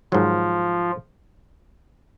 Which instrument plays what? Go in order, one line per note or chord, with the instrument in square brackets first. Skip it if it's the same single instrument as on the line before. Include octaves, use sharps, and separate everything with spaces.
[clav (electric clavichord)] G#2 D#3 F#3 [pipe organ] F3 F4